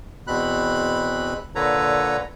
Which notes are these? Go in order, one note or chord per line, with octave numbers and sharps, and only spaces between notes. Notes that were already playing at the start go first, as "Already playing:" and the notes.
E2 B2 C4 B5 F#6
A#2 D3 A4 B4 C#5 A#5